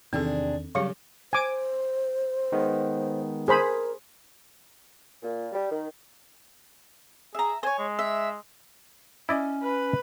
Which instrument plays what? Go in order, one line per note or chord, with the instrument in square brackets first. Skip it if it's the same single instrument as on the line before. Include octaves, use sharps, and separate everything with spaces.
[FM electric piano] E2 D#3 [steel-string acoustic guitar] C3 D4 G#4 [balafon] C4 A4
[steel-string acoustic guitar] C#3 [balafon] F#3 G3 G4 [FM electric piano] C#5 F5
[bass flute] C5 [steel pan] G#5 D6
[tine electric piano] D#3 G#3 B3
[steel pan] G#4 C5 B5 [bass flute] A#4
[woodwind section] A#2
G3
D#3
[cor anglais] G#4 [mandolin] E5 A#5
[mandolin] C5 C#5 [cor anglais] G#5
[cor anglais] G#3
[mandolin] E5
[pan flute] C#4 [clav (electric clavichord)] E4 D5 D#5
[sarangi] B4